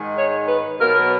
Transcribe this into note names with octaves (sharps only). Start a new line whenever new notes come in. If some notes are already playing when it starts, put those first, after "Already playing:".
Already playing: G#2 D#3 G#3
C#5
B4
B2 F#3 B3 A#4